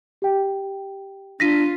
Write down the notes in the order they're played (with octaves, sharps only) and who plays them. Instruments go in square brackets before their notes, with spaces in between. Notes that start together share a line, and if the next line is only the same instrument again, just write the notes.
[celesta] G4 G5
[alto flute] D4 [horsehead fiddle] F4 [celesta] A#6 B6 D#7